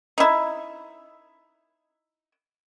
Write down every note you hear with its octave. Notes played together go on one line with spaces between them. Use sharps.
D#4 E4